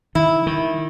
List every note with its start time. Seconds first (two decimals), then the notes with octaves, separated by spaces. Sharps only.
0.15 D#3 E4
0.47 D#3